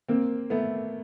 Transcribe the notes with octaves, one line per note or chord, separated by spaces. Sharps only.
A#3 C4
A3 B3